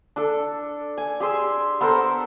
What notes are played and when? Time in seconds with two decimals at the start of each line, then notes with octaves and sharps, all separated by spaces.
0.16 D4 A4
0.98 G#5
1.20 G4 G#4 C6 E6
1.81 B3 A4 A#4 C5